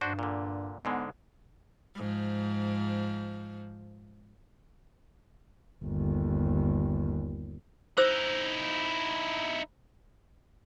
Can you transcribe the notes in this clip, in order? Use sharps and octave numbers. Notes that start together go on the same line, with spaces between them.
G2 D4 F#4 C5
A#2 D3
G#2 D3 G#3 B3
G#2 F3
G1 D#2
D#4 E4 C5 E6